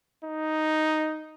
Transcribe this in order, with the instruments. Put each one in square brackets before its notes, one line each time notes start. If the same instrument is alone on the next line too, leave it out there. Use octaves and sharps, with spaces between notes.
[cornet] D#4